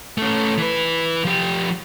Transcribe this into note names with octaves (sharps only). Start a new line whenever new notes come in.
A3 C#4
E3 B4
F3 G4